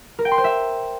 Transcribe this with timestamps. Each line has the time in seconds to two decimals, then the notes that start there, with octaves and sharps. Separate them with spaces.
0.19 A#4
0.25 G5
0.31 C6
0.38 C5
0.44 E5